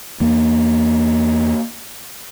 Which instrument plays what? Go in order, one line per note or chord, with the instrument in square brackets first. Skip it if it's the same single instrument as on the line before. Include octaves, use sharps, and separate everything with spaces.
[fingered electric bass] E2 A#3